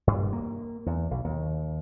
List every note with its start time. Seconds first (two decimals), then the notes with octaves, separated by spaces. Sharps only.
0.07 G2
0.33 A#3
0.86 E2
1.11 B1
1.25 D#2